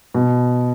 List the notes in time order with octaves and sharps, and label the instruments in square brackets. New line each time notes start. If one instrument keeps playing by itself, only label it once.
[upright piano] B2